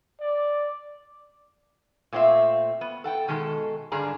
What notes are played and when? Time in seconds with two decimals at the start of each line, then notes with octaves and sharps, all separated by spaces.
0.21 D5
2.13 A#2 A3 C4 F4 E5
2.81 B3
3.04 A4 F#5 G5
3.28 B2 D#3 G#3 A4
3.92 G2 D3 D4 G#4 A#5